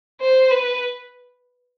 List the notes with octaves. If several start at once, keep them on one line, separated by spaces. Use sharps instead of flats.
C5
B4